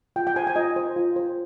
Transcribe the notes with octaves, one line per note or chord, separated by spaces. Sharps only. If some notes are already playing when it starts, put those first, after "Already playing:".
F4 G5
G5
C5 G#5
G#5
F4 D#5
C5
F4
C5